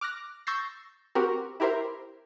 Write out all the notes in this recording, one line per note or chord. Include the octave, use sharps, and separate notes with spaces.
D6 F6 F#6 A#6
C#6 E6 G6 A6 A#6 C7
C4 F#4 G4 A#4
E4 G4 A#4 C5 E5